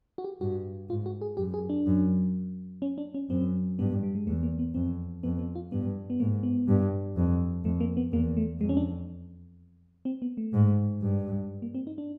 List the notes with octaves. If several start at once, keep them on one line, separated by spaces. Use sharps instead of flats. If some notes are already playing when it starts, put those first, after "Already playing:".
F#4
G4
G2 F#4
G#2 F4
F#4
G#4
F#2 G4
G#4
D4
F#2
C#4
D4
C#4
F#2 C4
G2 B3
G3
G#3
E2 A3
A#3
B3
F2 C4
F2 B3
B3
F4
G2 B3
B3
G#2 A#3
B3
G2
F2
F2 A3
A#3
B3
E2 A#3
A3
F2 G#3
C#4
D4
C4
B3
A3
G#2
G2
A#3
C4
D#4
D4